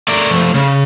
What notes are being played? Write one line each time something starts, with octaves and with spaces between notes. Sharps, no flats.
A3 A#4 D5
F3
C#3